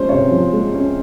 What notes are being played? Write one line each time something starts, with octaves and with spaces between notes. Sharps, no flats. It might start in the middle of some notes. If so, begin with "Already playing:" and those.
Already playing: F3 G#3 C#4 C5
C3 C#5
F3
G#3
C#4